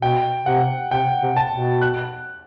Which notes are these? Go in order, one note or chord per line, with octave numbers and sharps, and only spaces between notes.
B2 G5
C3 F#5
C3 G5
C3
A5
B2
F#6